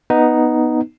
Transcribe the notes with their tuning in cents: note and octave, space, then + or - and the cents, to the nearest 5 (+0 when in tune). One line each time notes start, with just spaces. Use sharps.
B3 +0 D#4 +0